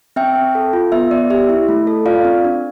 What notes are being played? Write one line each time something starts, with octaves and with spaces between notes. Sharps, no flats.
C4 E5 G5
C4
A4
F4
B3 E5
B3 D5
G4 E5
E4
A3
A4
F4 D5 F5
C4
D4